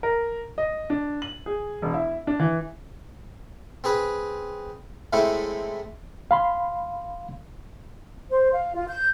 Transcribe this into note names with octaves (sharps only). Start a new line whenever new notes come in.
A#4
D#5
D4
F#7
G#4
E1
E4
D4
E3
C4 G#4 B4
A2 G#3 A3 C4 E4
F5 B5 C6
C5
F5
F4
G6